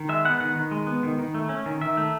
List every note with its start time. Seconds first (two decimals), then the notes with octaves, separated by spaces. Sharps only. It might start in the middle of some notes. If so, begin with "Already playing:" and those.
Already playing: D#3
0.09 G#3 E5
0.25 B3 F#5
0.40 D#3 F#5
0.55 D#3
0.71 G#3
0.87 B3
1.03 D#3
1.19 D#3
1.34 A3
1.49 C#4
1.66 D#3
1.81 D#3 E5
1.97 A3